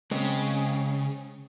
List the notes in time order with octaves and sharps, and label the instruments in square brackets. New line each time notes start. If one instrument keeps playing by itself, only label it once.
[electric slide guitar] C#3 [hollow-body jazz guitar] G#3 C4